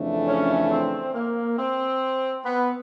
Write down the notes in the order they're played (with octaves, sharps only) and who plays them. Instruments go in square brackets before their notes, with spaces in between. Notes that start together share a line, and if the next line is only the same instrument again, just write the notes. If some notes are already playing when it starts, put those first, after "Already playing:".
Already playing: [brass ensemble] F2 C#3 E3 A3 D4
[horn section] C#4
C4
A#3
C4
B3